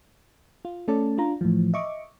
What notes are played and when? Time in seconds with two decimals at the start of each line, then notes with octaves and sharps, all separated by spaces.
0.65 F4
0.88 A3 C#4 A4 D5 A5
1.18 D4 F4 A#5
1.41 A2 E3 F3
1.74 D#5 E5 C#6 D6